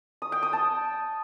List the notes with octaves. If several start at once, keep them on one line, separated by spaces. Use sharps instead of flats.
D#6
G5
D#6
A5